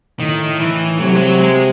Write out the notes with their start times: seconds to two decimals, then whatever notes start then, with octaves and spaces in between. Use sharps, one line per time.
0.20 A2 D#3
0.60 E3
1.00 C3 F#3
1.15 G#3
1.20 F#3
1.41 G#3